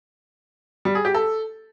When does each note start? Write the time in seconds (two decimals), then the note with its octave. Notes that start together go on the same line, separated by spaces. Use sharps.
0.85 G3
0.95 G#4
1.05 G4
1.14 A4